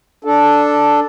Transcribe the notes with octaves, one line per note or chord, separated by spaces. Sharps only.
D4 A4